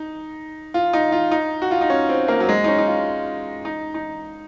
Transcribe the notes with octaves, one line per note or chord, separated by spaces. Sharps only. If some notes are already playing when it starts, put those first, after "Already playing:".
Already playing: D#4
F4
D#4
F4
D#4
F#4
F4
D#4
C#4
C4
A#3
F#3
G#3
D#4
C#4
D#4
F4
D#4
D#4